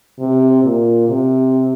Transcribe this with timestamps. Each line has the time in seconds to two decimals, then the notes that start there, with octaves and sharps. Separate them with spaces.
0.19 C3
0.64 A#2
1.08 C3